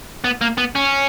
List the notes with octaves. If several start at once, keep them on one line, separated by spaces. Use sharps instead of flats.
B3
A#3
B3
C#4